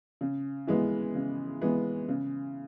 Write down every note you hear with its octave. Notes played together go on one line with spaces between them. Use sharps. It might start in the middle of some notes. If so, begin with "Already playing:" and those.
C#3
E3 G#3 B3
C#3
E3 G#3 B3
C#3